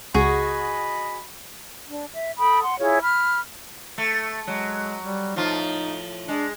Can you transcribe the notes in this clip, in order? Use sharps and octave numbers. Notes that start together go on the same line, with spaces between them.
C#2 F#4 G#4 D#5 B5
D4
E5
A4 G5 B5 D#6
F#5 C6
E4 F4 G#4 C#5
B5 F6
A3
F#3 G#3
G3
A2 F3 D#4 F4
G#3 D4